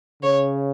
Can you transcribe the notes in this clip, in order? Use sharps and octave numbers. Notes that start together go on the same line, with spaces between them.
C#3 C#5